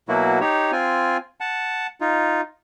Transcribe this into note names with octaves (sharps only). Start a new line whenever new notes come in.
B2 F#3 A#3 E4 F#4
D#4 G4 C#5
C4 F4 G#5
F#5 A5
D#4 F4